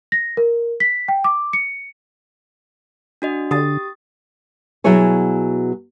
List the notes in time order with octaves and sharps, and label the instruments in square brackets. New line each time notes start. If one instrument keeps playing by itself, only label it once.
[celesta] A#6
A#4
B6
G5
D6
C#7
[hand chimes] D4 F#4 D#5
[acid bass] D3 [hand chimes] G4 D#6 A6
[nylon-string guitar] B2 F#3 E4 G#4 C#5 G#5